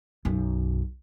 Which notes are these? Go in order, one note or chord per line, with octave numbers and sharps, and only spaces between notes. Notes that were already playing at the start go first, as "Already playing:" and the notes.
B1 F#2